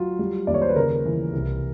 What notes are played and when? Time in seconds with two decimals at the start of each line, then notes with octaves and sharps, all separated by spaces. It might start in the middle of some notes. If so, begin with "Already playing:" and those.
Already playing: F#3 F4
0.19 G3
0.47 D#2 D5
0.54 C#5
0.62 C5
0.69 B4
0.76 C#3 A#4
1.05 E3
1.33 C2